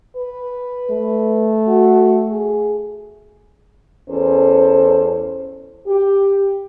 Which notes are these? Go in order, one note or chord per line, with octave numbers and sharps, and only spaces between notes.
B4
A3
F#4
G#4
E2 C#4 A4 C5
G4